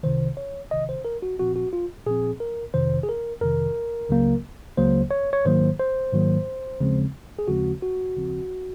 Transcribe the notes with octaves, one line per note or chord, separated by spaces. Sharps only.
C2 C3 D#3 C5
C#5
C2 C3 D#3 D#5
C5
A#4
F#4
A#2 F3 C4 F#4
F#4
F4
A#2 F3 C4 G#4
A#4
F2 C3 D#3 C5
G#4
A#4
F2 C3 D#3 A#4
C#2 C#3 F#3 A#3
C#2 C#3 F#3 A#3 C5
C#5
C#5
G#2 D#3 F#3 A#3 C5
C5
G#2 D#3 F#3 A#3
D#2 C#3 F3 G#3 C4
G#4
D#2 C#3 F3 G#3 C4 F#4
F#4
D#2 C#3 F3 C4